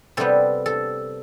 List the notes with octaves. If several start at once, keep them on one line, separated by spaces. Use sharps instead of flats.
C3 G3 B3 A4
A4